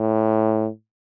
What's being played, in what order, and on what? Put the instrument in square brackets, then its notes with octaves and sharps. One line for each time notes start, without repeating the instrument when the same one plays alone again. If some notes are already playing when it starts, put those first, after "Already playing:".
Already playing: [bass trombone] A2